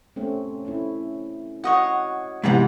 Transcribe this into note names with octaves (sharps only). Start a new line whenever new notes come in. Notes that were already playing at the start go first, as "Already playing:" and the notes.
A3 C4 C#4
C4 C#4 E4
F#4 C#5 D#5 F5 F#5
G#2 C3 E3 G#3 B3